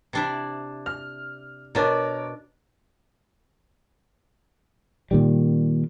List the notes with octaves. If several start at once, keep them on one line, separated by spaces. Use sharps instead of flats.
C3 D4 E4
F6
B2 D4 A#4 C#5 D6
A#2 D#3 G3